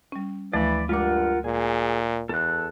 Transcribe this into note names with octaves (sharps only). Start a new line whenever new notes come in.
G3 C#4
D2 E3 F3 A3 D5 B5
G2 G#3 F4 A#4 F#5 D6
A#2 G#4
E2 A4 F#6